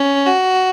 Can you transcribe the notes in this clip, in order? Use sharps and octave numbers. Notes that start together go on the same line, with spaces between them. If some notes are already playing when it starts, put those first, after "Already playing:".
Already playing: C#4
F#4